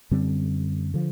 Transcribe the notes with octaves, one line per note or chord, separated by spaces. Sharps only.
F#2 D3 G3 C4
D3 F3